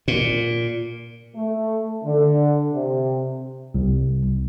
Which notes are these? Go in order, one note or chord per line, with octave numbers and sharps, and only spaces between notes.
A#2
A3
D3
C3
C2